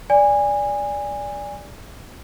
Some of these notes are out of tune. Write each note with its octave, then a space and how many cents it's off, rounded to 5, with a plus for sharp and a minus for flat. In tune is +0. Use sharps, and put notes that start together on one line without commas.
D5 -10 G#5 -20